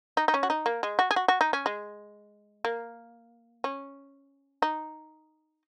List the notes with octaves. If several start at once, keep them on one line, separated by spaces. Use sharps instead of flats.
D#4
D#4
C#4
F#4
D#4
A#3
G#3
F#4
G#4
F#4
F#4
D#4
C#4
G#3
A#3
C#4
D#4